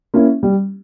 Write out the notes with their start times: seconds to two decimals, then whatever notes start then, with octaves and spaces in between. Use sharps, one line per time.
0.14 A#3 C#4 E4
0.43 G3